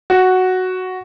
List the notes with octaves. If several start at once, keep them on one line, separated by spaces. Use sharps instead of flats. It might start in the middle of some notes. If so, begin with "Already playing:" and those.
F#4